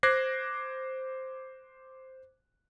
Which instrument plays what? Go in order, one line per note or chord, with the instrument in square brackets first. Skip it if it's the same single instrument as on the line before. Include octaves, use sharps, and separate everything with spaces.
[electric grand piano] C5 D6 F#6 G#6 A#6 C7